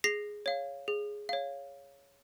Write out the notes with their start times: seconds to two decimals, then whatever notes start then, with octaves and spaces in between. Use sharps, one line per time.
0.04 G#4 A#6 C7
0.46 C#5 F5
0.88 G#4
1.29 C#5 F5